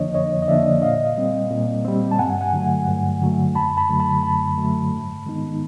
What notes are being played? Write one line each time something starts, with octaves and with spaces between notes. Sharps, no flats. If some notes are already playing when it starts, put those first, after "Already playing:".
Already playing: F2 D3 F3 A#3 D4 C#5 D#5
F2 C#5 D#5
D#5
D3 F3 A#3 D4 D5 E5
A#2 D#5 F5
G3 C4
A#2
G3 C4
A5
G2 F#5 G#5
F#5 G#5
D3 F#3 A3
G2
D3 F#3 A3
F#2 A5 B5
A5 B5
D3 F#3 A3
A5 B5
F#2 A5 B5
D3 F#3 A3
G#2
D#3 G#3 B3 D#4